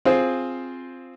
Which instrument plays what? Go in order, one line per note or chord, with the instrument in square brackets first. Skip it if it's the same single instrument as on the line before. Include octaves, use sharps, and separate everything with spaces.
[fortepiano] C4 F4 G#4 C5